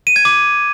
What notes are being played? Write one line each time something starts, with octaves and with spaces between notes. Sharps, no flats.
D#7
G#6
D6